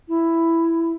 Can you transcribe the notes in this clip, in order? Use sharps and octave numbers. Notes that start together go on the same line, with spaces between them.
E4